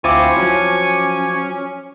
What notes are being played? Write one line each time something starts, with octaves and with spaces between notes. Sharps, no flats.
D2 C4 E4 F4 G#5 C#6 D6 D#7
F3 F#3 C#4